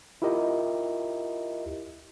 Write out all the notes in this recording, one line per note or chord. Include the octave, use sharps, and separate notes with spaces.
E4 F4 G4 A#4 D#5